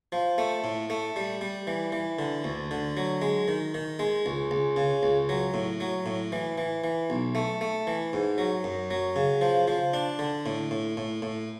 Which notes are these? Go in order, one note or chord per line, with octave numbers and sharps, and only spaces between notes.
F3
A3
A2
A3
G3
G3
E3
E3
D3
D2
D3
F#3
G#3
D#3
D#3
G#3
C#2
C#2
C#3
C#2
F#3
A2
F#3
A2
E3
E3
E3
B1
A3
A3
E3
G#2
F#3
F#2
F#3
C#3
F3
F3
D4
D3
A2
A2
A2
A2